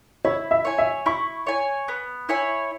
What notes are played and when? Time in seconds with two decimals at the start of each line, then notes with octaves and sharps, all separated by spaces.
0.25 E4 C#5
0.51 E5
0.65 C#5 G#5
0.78 E5
1.06 E4 C#6
1.47 C#5 G#5
1.88 B3
2.29 E4 C#5 G#5